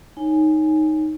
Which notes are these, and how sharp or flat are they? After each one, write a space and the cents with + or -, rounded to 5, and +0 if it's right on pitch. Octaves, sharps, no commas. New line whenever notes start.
D#4 +0 C#5 +0 G#5 +0